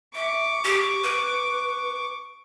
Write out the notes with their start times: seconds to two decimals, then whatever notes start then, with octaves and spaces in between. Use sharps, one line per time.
0.15 E5 C#6 D6
0.64 G4
1.03 B4